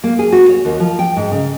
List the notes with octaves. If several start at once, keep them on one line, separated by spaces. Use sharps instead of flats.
A#3
G#4
F#4
C#5
D#2
F3
G5
G#2
C#3